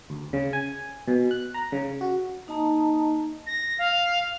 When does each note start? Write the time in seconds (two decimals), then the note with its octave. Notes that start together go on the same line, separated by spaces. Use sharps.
0.10 D2
0.33 C#3
0.53 G#5
1.08 B2
1.31 F#6
1.54 A#5
1.72 C#3
2.01 F#4
2.47 A#3 D#4 D#5 A5 A#5 D#6
3.46 A#6
3.78 F5